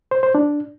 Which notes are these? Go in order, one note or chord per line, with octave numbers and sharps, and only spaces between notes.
C5
C5
D4